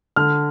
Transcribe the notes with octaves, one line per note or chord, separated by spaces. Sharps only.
D3 F6